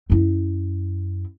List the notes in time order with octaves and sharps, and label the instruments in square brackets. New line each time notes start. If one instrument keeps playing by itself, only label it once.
[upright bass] F#2 E4